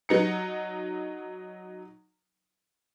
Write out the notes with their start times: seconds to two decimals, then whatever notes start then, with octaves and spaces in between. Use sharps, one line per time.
0.09 F#3 D#4 C#7